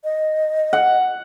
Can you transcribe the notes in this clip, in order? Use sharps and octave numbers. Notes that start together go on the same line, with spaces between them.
D#5
F#5